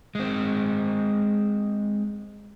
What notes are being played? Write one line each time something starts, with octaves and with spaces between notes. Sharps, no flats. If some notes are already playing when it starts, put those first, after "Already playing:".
G#3 C4